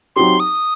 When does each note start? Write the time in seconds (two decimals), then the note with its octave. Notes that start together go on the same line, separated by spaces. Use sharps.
0.16 F#3 C4 D#4 G4 C6
0.40 D#6